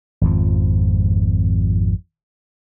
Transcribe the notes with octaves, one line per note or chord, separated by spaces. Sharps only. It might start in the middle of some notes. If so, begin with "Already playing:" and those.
G#1 F2 F3